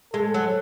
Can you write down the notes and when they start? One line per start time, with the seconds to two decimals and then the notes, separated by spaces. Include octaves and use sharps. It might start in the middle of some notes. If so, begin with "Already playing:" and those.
0.13 G#3 A4
0.34 F#3